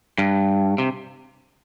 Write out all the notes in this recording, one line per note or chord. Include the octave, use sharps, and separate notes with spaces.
G2
C3